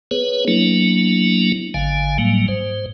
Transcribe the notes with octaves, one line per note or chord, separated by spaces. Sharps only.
B3 G#4 B4 C#5
F#3 A#3 B3 D4 E4
G#1 D3 F5 G#5
A2 F#3 G3 A#3
G#2 C5